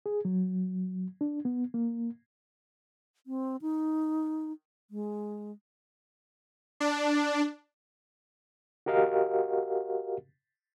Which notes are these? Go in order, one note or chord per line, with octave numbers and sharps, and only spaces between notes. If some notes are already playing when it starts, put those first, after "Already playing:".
G#4
F#3
D4
B3
A#3
C4
D#4
G#3
D4
F#4 G4 A#4 D#5 F5 F#5